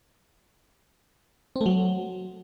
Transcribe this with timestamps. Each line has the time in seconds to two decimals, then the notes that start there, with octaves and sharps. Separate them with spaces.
1.56 C4
1.61 A3
1.66 F#3